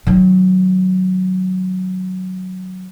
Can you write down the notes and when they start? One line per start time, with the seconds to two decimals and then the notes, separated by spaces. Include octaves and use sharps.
0.07 D#3 F#3